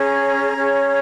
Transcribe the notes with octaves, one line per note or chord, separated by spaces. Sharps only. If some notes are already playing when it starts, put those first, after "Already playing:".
Already playing: C#4 G#4 C#5 A#5
C#4 G#4 C#5